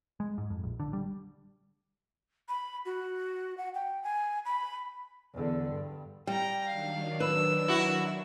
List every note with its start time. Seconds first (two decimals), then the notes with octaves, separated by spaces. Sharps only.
0.20 G#3
0.38 G#2
0.50 F2
0.64 A#1
0.80 D3
0.93 G3
2.49 B5
2.85 F#4
3.58 F#5
3.75 G5
4.03 G#5
4.45 B5
5.34 E2 D3
5.70 G2
6.27 G3 G5 A#5
6.67 D#3 F#3 D4 F5
7.20 B4 E6
7.68 E4 F#4